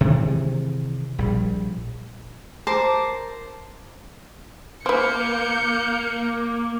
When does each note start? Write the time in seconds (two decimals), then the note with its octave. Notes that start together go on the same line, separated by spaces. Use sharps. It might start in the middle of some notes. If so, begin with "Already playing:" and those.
0.01 C3 D#3 E3 G#3
1.18 A#1 G3
2.67 A#4 C5 A5 D6
4.86 A#3 B4 C5 G6 C#7